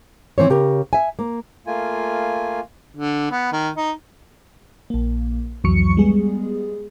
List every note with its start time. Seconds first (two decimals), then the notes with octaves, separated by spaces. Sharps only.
0.38 E3 C4 C5 C#5
0.50 C#3 G4 A#4
0.93 E5 G#5
1.19 A#3
1.67 A3 A#3 F4 G#5
2.97 D3
3.31 B3
3.52 D#3
3.77 D#4
4.90 A#1 A#3
5.64 C2 F2 E3 F#3 C#6 C#7
5.97 G3 G#3 B3 G#4